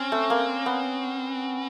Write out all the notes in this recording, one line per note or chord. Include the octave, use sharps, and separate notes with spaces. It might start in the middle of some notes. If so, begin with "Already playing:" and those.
Already playing: C4 C#4
A3
A#3
B3